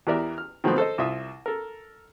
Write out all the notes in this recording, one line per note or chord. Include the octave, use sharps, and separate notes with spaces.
E2 E3 G4 A#4 D5 E5
F6
D#3 F3 F#3 A3 B3 C4
A4 C5 D#5
C2 F4 E5 D#6
A4 A#4